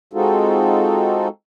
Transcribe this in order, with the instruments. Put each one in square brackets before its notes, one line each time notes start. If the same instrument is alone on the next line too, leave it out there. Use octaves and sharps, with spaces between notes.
[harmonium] G#3 C4 D#4 F4 F#4 A4